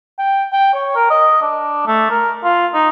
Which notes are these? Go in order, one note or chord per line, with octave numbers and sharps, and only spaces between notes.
G5
G5
C#5
A#4
D#5
D4
A3
A#4
F4
D#4